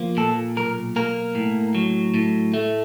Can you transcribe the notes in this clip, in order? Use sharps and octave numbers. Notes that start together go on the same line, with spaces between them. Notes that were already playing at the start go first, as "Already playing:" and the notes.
Already playing: F3 A#3
A#2 A4
B1 A#4
A#3 A#4
A2
F#3
A2
A3